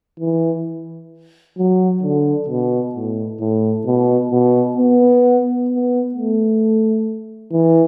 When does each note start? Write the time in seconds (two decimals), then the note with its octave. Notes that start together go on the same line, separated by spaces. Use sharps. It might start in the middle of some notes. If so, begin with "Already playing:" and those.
0.20 E3
1.57 F#3
2.03 D3
2.48 B2
2.95 A2
3.40 A2
3.86 B2
4.31 B2
4.77 B3
5.69 B3
6.15 A3
7.52 E3